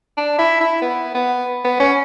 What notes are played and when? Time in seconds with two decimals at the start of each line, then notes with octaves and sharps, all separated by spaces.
0.17 D4
0.39 E4
0.61 E4
0.82 B3
1.15 B3
1.64 B3
1.80 C#4